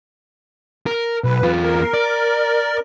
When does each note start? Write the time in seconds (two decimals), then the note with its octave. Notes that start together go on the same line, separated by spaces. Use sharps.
0.86 A#4
1.24 B1 B4
1.43 E2 F4
1.63 A#4
1.94 D5